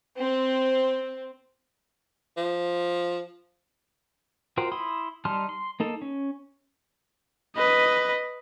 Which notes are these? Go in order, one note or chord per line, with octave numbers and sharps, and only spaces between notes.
C4
F3
F4 F#4 A#4 C5 G5
E4 B5 C6 D#6
G3 D#4 A5 C6 F6
C6
A#3 D#4 A4
C#4
B4 D#5